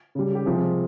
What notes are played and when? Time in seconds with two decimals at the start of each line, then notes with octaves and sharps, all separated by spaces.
0.15 C#3 G3
0.35 G4
0.46 C3 F3 G#3 G#4